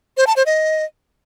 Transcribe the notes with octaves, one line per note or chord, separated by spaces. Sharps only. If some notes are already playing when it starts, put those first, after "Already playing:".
C5
A5
C5
D#5